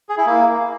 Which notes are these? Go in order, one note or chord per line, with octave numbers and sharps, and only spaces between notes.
G#4
E4
A#3